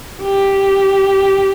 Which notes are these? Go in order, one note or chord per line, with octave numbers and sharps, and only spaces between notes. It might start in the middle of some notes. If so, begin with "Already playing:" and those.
G4